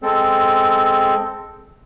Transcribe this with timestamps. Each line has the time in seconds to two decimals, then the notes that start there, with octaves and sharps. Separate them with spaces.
0.03 G#3 C4 A4